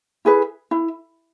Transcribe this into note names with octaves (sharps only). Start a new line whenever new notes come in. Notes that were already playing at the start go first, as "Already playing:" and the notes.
E4 G#4 B4
E4